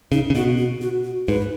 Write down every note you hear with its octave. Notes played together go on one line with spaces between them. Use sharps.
C#3 D#4
C#3
B2 F#4
F#4
F#4
F#4
G#2 B4